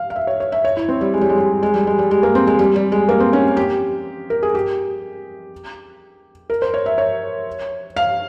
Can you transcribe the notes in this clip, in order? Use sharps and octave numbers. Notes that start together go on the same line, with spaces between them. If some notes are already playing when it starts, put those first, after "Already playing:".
Already playing: F5
F5
E5
C#5
C#5
E5
C#5
E4
C4
G3
G#3
G3
G#3
G3
G#3
G3
G#3
G3
G#3
A#3
C4
G#3
G3
G3
G#3
A#3
C4
C#4
G4
A#4
G#4
G4
A#4
C5
C#5
E5
C#5
F5